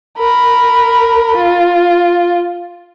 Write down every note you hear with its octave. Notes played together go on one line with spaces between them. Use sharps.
A#4 B5
F4